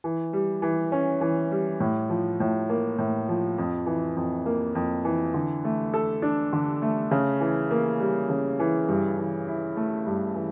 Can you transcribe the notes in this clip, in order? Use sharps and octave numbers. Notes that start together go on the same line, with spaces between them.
E3
G3
E3
C#4
E3
G3
A2
F3
A2
A#3
A2
F3
F2
E3
F2
A#3
F2
E3
D3
A3
A4
D4
D3
A3
C#3
E3
A#3
G3
C#3
E3
G2
E3
E4
A3
G2
E3